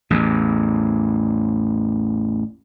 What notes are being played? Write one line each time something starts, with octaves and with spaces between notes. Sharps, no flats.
A1 E2